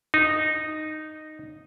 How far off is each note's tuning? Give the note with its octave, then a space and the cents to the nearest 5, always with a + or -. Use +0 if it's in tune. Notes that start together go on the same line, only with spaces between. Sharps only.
D#4 -10